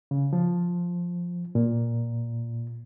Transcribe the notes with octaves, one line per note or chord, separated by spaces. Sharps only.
C#3
F3
A#2